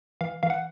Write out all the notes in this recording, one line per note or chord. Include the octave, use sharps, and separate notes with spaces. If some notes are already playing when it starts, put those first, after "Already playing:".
E3 F5
E3 F5
F#5